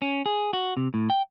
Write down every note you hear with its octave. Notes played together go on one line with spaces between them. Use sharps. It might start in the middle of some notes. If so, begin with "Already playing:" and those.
C#4
G#4
F#4
C3
A2
G5